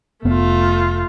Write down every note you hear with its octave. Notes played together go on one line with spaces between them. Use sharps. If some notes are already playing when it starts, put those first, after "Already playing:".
F1 A3 B3 F4